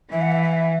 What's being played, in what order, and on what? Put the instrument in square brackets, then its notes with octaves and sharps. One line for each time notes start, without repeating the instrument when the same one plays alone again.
[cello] E3 [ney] E5
[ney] F#5
E5
E5